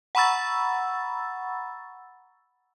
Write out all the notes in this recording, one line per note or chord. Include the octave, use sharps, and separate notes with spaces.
F#5 A#5 B5 C#6 E6 A6